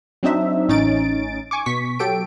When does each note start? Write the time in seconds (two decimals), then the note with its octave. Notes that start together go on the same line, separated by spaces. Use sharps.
0.23 F#3 C4 D4 D#4 E5
0.69 A1 C#4 D#4 A6 D7
1.51 G#5 C#6 D6
1.66 B2 C#6 B6
1.99 F#3 G4 A4 D7